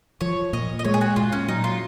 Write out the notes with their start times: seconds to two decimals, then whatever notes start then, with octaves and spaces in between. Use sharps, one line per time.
0.21 F3 C#5
0.53 A#2 D#5
0.79 D#5
0.84 G#3 C#5
0.94 G#4
1.01 F#4
1.16 A#2 F4
1.32 C#4
1.48 F#3 D#4
1.64 F4